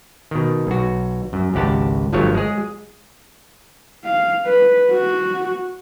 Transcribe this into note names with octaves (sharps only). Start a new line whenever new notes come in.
B2 D#3
B1 F#4
F#2
G#1 C#2 G4 F#5 A5
G1 G2 F3 F#3 A3 C#5
G#3 G#4
F5
B4
F#4